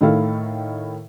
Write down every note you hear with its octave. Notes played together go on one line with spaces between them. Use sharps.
A2 D#3 E4 A4 F5